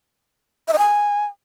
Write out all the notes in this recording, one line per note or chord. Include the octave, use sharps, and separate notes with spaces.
E5
D#5
G#5